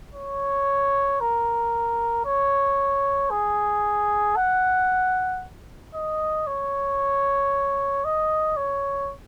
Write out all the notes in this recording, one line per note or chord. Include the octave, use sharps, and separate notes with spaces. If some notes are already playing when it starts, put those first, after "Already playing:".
C#5
A#4
C#5
G#4
F#5
D#5
C#5
D#5
C#5